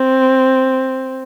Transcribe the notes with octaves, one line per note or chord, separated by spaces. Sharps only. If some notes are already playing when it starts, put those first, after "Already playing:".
Already playing: C4